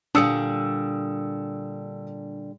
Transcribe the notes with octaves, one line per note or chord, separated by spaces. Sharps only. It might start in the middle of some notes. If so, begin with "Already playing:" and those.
A#2 D3 G3 D4 D#6 E6 C#7